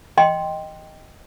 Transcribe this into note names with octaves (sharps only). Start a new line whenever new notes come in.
D#5 G5 C6